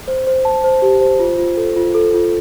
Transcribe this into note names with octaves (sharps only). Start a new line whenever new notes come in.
C5
C5
A5
C5
G4
C5
F4
F4
A4
F4
A4
F4